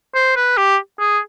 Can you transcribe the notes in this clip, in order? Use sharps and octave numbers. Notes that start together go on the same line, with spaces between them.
C5
B4
G4
G#4